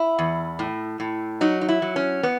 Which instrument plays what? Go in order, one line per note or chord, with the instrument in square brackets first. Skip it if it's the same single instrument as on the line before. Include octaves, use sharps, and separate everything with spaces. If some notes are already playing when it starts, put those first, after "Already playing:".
Already playing: [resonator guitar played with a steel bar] E4
E2
A2
A2
F#3 D#4
D#4
E4
F#3
C#4
B3